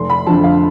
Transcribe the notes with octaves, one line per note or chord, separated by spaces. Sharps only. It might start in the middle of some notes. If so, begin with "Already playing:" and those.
Already playing: F1 C6
B5
F2 D3 F3 A5
F5